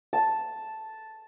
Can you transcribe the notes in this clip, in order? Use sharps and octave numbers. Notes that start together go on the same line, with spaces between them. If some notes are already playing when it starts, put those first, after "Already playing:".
A5